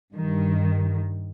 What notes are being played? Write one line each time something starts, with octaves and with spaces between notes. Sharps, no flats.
G2 D#3